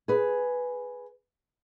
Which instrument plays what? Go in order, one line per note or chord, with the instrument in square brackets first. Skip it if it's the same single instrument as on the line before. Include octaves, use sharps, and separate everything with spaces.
[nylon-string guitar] G#4 B4